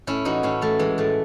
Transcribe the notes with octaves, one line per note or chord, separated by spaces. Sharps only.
A2 C#4 E4
E3 D#4 F#4
A2 C#4 E4
E3 A3
E3 G#3
A2 A3